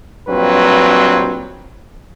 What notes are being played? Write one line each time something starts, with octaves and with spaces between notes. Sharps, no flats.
A#1 G2 F#3 C4 B4